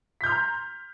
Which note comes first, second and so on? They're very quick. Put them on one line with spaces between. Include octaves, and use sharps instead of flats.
B6 G6 F6 C6 A#5